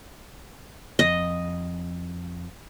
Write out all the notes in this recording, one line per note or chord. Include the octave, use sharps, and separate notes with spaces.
F2 D#5